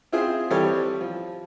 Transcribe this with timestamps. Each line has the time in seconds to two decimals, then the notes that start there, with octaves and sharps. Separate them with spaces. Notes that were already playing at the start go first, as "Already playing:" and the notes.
0.13 C4 E4 F4 G#4 C5
0.50 E3 G3 C4 G4 A4 C#5
1.01 F3